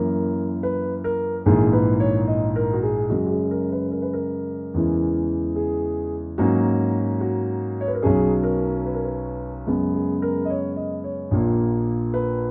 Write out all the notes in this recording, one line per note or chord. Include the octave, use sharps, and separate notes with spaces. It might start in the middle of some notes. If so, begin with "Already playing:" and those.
Already playing: F#2 E3 A#3 A#4
B4
A#4
A#1 G#2 E3 A#3 G#4
B4
C#5
D#5
A#4
F#4
G#4
F#2 C#3 G#3 F#4
F#4
G#4
A#4
B4
A#4
B4
A#4
E2 C#3 E3 G#3
G#4
G#2 F#3 A#3 C#4 F#4
F#4
C#5
B4
A#4
B1 B2 F#3 C#4 G#4
A#4
B4
A#4
B4
F#2 C#3 G#3 B3
G#4
A#4
D#5
C#5
D#5
C#5
A#1 A#2 A#3
B4